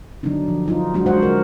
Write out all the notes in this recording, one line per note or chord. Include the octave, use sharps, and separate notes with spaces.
D3 F#3 B3 D4 D#4
F3
F#3 D#4 F4
F#3 G#3 D4 D#4 F4 F#4
G#3 D#4 F#4 C5 D#5 F#5
D3 A#4